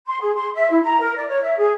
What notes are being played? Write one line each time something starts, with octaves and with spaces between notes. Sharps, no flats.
C6
G#4
C6
E5
E4
A#5
A#4
D5
C#5
E5
G#4